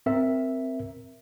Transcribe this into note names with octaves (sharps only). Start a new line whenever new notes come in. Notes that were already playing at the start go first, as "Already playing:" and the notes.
C4 A#4 E5